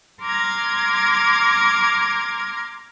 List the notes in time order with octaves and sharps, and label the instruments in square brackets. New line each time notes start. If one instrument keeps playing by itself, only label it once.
[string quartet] A#5 C6 D6 F6 G#6 A#6